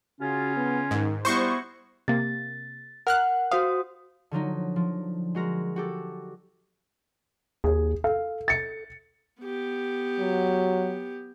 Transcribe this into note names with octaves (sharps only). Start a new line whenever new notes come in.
C#3 C#4 F4 F#4
B3
G#2 D#3
G3 B3 E4 F#4 C5 C#6
C3 A#3 A6
A#4 F#5 F6 F#6
F#4 C5 F5 D#6
D3 F3 F#3 D#4
F3
G#3 F#4 A#4
F#4 G4 A4
D#2 G#4
A4 F5
A6 C#7
B3 G4
F#3